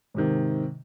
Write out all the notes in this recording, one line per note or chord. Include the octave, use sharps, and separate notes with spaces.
G#2 C3 D#3